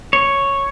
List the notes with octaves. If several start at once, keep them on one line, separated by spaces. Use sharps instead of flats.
C#5